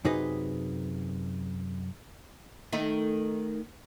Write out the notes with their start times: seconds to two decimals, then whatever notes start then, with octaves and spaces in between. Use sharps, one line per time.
0.05 F#2 C3 D#4 G#4 B4 D#5
2.72 D#3 A3 D#4